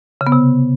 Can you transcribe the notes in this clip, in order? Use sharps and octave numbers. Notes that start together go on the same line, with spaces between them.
C#3
B3
C3